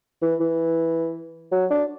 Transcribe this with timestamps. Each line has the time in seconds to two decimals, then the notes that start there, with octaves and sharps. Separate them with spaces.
0.22 E3
0.40 E3
1.52 F#3
1.71 D4